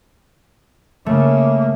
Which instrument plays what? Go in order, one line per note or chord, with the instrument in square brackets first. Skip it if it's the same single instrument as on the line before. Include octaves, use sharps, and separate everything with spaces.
[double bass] C#3 A#3 [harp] A3